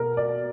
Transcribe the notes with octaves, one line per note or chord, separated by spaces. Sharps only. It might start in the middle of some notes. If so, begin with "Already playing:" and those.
Already playing: B2 A#4
D5